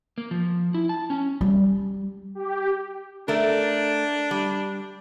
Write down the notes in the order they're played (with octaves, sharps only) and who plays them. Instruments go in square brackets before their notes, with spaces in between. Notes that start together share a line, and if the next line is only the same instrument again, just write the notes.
[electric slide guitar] A#3
F3
E4
A5
C#4
[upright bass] G3
[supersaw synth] G4
[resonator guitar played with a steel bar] A3 A#4 [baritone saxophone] D4
[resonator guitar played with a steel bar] G3